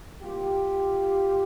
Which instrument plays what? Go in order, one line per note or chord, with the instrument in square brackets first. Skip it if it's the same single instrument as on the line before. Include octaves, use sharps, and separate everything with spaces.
[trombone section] C2 A#2 F4 G4